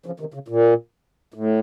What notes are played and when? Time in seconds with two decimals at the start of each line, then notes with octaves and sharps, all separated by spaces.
0.06 C#3 F3
0.20 C3 D#3
0.34 C#3
0.48 A#2
1.34 A2